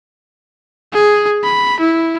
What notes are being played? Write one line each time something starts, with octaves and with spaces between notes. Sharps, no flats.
G#4
B5
E4